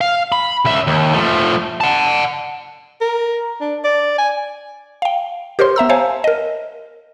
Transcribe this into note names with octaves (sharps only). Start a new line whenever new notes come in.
F5
B5
C#2 E5
D#2
F3 A3
F#5 A5
A#4
D4
D5
G#5
F5 G5
G4 A#4 C5 C#5 C6
B3 E5 A#5 E6
C5 C#5 F5 G#5 A5
A#4 D#5